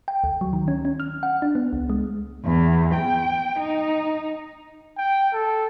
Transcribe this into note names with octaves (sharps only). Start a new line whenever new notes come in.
G5
D2
F#3
D#3
C#4
C#4
F6
F#5
D4
B3
C#2
G#3
E2
G5
D#4
G5
A4